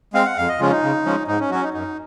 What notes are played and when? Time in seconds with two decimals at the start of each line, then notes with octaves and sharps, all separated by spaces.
0.14 G#3 C4 F5
0.25 F#5
0.37 F2 F5
0.49 D#5
0.59 C#3 F3 G#3 C#4 F4
0.71 D#4
0.82 C#3
1.05 F3 G#3 C#4
1.27 G#2 D#4
1.40 C#4
1.50 F#3 C#4 F#4
1.63 D#4
1.73 F#2 D#4